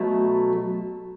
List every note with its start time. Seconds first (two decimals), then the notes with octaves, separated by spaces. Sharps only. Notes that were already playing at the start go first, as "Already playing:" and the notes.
Already playing: B2 F#3 A3